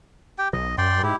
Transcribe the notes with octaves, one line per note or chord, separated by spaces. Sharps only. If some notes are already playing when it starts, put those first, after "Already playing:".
G4 G5
B1 D#5
F#2 D5 G5 C6
G#2 E4 G4